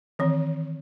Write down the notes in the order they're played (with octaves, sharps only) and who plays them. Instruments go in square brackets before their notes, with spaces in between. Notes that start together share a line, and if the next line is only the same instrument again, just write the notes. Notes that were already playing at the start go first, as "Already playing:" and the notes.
[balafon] D#3 E3 C4